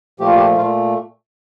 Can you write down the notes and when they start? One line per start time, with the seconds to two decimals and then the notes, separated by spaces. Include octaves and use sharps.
0.20 A#2 F3 A3 G4
0.27 F4
0.35 G4
0.57 A#2 A3 F4